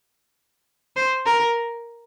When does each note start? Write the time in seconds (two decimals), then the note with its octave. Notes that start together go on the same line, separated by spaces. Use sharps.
0.96 C5
1.26 A#4